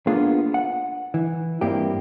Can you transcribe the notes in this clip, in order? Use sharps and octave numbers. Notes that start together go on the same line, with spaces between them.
A#3 B3 D4 F4 G#4 A#4
F#5
E3
G2 A#3 C4 E4 G4